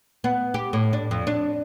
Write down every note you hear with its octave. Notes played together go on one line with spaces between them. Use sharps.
B3
G4
A2
D4
F2
D4